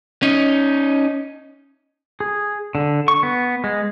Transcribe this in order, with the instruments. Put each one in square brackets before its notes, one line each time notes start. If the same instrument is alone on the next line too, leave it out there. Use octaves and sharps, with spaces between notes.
[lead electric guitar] C#4 D#4
[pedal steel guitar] G#4
D3
C#6
B3
G#3